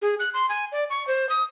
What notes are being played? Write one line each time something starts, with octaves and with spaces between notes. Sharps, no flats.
G#4
F#6
C6
G#5
D5
C#6
C5
D#6